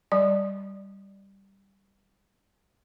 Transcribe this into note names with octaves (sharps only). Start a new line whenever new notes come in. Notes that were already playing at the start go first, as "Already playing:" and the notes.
G3 D5